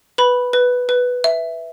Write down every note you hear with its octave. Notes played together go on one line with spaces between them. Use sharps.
B4 B5
B4
B4
E5